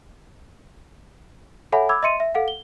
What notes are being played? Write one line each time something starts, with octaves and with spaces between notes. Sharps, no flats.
A4 C#5 E5 F#5 G#5 B5
B5 D6 E6 G#6
D#5 E5 C6 C#7 D#7
E5
A4 F5 F#5
G7